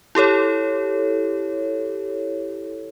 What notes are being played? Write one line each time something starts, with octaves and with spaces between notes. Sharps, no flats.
E4 G4 A4 C#5